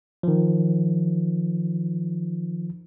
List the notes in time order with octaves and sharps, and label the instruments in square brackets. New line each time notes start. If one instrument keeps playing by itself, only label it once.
[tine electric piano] D#3 F3